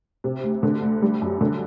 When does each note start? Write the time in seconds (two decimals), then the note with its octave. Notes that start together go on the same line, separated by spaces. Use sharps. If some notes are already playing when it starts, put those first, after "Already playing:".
0.24 C3
0.43 D2
0.63 D3
0.82 D2
1.02 G3
1.22 F#2
1.41 D3